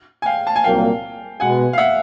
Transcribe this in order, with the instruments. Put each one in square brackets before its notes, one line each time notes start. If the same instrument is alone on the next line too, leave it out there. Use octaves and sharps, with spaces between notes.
[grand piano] G#5
F5 G5
A5
G#5
[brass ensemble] C2 A#2 F#3 A#3 [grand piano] F5 G5
[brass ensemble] B2 G#3 B3 [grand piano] F#5 G#5
[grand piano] F5
E5 F#5